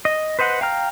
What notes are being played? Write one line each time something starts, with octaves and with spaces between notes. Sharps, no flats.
D#5
B4 C5 D#5 F#5
F5 G5 A#5 F6